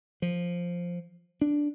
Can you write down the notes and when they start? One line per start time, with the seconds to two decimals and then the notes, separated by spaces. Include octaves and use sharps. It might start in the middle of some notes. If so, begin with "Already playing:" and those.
0.22 F3
1.41 D4